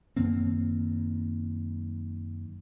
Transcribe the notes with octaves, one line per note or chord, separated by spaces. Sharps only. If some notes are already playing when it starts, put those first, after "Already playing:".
F#2 D#3 A#3 C4